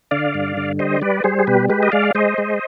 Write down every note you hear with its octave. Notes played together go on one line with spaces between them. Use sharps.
D3 D5 F5
G2
D3
G3 C5 D#5
G3 B4 D5
G3 G#4 C5
G#4
B2 G4 B4
G#3 G4 B4
D#5
G#3 D5 F5
G#3 C5 D#5
G#3